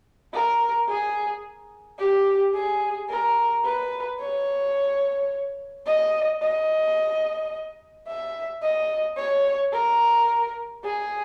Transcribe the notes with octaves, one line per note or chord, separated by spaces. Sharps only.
A#4
G#4
G4
G#4
A#4
B4
C#5
D#5
D#5
E5
D#5
C#5
A#4
G#4